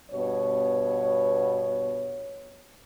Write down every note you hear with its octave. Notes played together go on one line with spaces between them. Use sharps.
G2 B2 B3 C#5